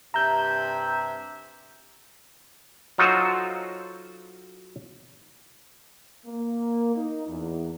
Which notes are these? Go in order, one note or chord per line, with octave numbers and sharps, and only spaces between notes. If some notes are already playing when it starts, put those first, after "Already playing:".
G2 C3 E5 A#5 G6
F#3 D#4 F4 F#4 A4 C5
A#3
D#4
E2